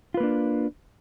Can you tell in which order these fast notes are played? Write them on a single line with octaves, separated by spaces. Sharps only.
F4 B4 A#3 D4